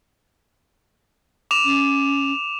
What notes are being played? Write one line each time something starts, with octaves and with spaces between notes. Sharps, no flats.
D6 E7 F7
C#4